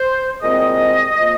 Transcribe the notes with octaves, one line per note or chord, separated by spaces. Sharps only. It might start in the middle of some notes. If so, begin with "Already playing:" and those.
Already playing: C5
C2 A#2 G#3 C4 D#5
F3 A#3